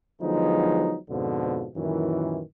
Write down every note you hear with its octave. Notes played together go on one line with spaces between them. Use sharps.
D3 F3 F#3 G#3 B3 D#4
F2 G#2 B2 D3 F3
F#2 A#2 D#3 E3